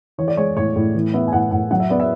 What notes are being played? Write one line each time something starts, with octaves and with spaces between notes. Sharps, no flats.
E3 C#5
D5
G#3 C#5
A2 C#5
A2
E3
B3 E5
G#5
A2 F#5
A2 F#5
F#3 F#5
E5
B3 D5
E5